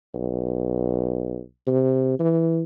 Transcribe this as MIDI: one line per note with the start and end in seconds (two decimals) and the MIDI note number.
0.14 1.39 35
1.67 2.16 48
2.19 2.62 52